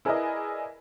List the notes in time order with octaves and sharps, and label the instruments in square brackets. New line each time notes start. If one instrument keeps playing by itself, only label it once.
[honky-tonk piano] E4 G#4 A#4 B4 D5 D#5